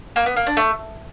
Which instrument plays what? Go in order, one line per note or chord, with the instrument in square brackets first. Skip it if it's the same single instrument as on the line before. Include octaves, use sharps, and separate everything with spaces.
[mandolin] A#3
B3
A#3
D4
A3